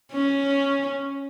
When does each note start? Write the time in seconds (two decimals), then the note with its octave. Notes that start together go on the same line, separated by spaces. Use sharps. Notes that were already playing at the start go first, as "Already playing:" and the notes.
0.12 C#4